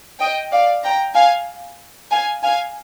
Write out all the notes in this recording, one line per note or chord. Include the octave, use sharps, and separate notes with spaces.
D#5 G5
D5 F5
G5 A#5
F5 G#5
F5 G#5
F5 G#5